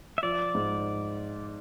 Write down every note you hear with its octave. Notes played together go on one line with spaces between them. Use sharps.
E5
F3 D5
G#2